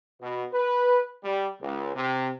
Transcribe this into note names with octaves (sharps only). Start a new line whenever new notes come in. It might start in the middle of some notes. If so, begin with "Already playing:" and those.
B2
B4
G3
C#2
C3